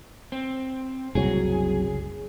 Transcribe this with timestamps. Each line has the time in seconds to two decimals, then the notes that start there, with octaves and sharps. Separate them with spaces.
0.32 C4
1.15 F#1 C2 F#3 G#4